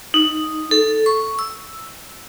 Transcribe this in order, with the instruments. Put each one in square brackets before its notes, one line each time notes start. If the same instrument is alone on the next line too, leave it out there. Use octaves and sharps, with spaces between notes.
[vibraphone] D#4
A4
C#6
E6